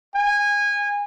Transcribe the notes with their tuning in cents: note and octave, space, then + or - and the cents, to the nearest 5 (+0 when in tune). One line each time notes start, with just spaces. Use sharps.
G#5 -20